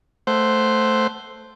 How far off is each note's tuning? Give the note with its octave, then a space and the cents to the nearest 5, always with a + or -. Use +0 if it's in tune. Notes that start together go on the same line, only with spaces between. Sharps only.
A3 +0 C5 +0 F#5 +15